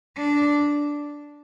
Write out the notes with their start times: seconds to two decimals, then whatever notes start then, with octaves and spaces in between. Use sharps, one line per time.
0.17 D4